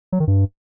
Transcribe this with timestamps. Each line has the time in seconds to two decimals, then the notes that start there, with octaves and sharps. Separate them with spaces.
0.12 F#3
0.20 D#3
0.27 G2